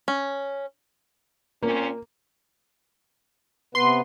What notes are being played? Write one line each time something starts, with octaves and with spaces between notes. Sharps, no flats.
C#4
A#2 A#3 C4 C#4
C3 B3 B4 C6